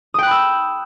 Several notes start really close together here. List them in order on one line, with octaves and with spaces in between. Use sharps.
D#6 G5 F#6 B5 E6